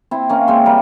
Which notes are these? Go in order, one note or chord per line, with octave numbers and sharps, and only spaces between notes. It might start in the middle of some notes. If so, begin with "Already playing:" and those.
C4 E4
A#3 C#4
G#3 C4
G3 A#3